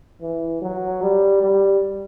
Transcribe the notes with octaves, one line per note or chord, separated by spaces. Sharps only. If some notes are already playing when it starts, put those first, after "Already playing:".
E3
F#3
G3
G3